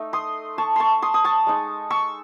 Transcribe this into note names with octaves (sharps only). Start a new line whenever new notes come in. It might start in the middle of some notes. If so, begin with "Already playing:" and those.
Already playing: A3 D#4
C6 D#6
A5 C#6
A5 C6 C#6
C6 D#6
D#6
A5 C#6
G#3 D#4
C#6 E6